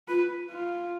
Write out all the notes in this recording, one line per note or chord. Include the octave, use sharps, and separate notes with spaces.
F4 B4
F4